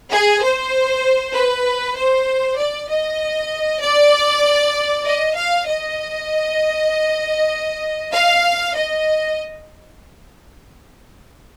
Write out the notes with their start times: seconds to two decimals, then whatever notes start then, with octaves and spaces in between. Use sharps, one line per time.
0.12 G#4
0.43 C5
1.34 B4
1.97 C5
2.58 D5
2.89 D#5
3.82 D5
5.04 D#5
5.35 F5
5.65 D#5
8.12 F5
8.74 D#5